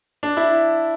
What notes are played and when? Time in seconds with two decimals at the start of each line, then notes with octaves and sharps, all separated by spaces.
0.23 D4
0.37 E4